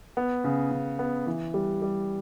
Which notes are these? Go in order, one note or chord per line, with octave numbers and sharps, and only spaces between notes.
B3
C#3
C#3
B3
E3
G3
G3